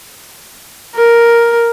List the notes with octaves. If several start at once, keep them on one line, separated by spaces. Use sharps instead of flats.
A#4